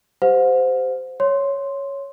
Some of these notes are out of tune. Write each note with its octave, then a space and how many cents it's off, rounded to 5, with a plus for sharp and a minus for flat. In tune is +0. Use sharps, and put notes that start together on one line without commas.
G4 +0 C5 -20 F#5 -45
C#5 +0 C6 +0